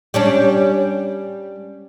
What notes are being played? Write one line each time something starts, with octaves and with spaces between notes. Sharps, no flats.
G3 C#4 D4